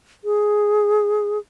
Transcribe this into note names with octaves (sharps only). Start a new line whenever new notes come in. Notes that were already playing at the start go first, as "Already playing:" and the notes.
G#4